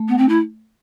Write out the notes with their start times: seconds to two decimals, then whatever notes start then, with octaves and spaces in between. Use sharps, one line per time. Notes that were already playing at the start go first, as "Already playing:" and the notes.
Already playing: A3
0.08 B3
0.18 C4
0.29 E4